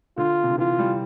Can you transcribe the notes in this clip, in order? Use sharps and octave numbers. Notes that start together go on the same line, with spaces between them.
D3 F4
C3
D3
E3 F4
G3